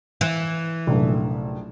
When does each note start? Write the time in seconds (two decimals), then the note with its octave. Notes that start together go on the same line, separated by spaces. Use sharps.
0.21 E3
0.87 F1 A#1 F#2